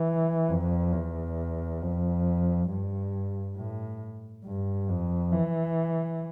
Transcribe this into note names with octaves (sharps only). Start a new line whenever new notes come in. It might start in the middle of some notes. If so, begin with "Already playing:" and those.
Already playing: E3
F2
E2
F2
G2
A2
G2
F2
E3